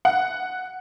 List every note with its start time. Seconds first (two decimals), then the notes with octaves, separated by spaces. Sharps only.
0.05 F#5